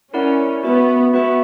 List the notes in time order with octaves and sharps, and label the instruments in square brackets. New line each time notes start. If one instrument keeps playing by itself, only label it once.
[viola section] C#4 [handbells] E4 A#4 D5 F#5
[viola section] B3 [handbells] F#4 B4 E5
[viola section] B3 [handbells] F#4 B4 E5